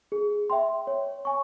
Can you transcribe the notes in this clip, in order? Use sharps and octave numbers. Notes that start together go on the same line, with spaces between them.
G#4
E5 G5 C6
C#5
G#5 C#6